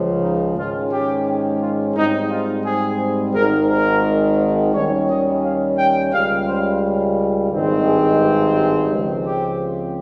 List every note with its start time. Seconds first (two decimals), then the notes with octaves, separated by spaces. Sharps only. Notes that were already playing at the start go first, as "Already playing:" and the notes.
Already playing: C#2 C#3 F3
0.23 D#4
0.58 G#2 D#3 G#3 C#4 F4
0.93 G4
1.62 F4
1.97 G#2 G3 C4 D#4
2.31 F4
2.66 G#4
3.35 G#1 G#2 D#3 A#4
3.70 A#4
4.74 D#2 D#3 G3 C#4 C#5
5.09 D#5
5.43 F5
5.78 G5
6.13 C#2 C#3 G3 F5
6.48 C5
7.52 G#1 G2 D#3 G#3 C4
7.86 G#4
8.21 G4
8.56 G4
8.91 C#2 C#3 F3 C4
9.25 G4